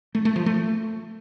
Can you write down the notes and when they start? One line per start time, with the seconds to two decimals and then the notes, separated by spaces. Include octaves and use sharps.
0.15 A3
0.25 A3
0.36 F3
0.46 A3